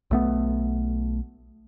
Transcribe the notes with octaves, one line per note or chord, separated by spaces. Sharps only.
B1 A3 B3